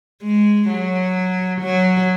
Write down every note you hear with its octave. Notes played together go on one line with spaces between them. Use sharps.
G#3
F#3
F#3